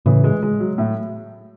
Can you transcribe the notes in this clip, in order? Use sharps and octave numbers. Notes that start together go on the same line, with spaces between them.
A2 C#3 E3
G#3
G#3
F#3
A2